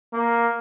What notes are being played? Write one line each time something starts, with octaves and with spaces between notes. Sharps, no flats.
A#3